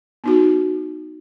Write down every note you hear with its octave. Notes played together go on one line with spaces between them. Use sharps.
B3 D#4 F#4